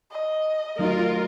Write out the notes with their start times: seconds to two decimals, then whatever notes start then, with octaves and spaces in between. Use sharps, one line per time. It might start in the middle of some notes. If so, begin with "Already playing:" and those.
0.11 D#5
0.79 F#3 A3 D#4 F4 A#4